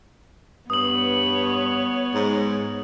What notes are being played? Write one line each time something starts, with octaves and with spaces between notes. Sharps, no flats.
G2 B3 C#5 D#6 F#7
G#2